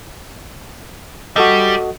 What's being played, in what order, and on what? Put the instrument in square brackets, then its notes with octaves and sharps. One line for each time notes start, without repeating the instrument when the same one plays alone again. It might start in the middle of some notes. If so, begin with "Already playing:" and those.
[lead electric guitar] G3 [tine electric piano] F#4 A4 D#5